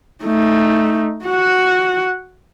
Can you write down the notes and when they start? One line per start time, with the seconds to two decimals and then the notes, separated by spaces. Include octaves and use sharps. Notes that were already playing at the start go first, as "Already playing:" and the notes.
0.24 A3 D#4
1.24 F#4 F#5